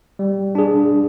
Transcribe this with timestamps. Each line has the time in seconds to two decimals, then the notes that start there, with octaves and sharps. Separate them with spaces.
0.19 G3
0.55 D4 G#4